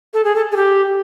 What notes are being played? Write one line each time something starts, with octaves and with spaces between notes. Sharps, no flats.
A4
G#4
A4
G#4
G4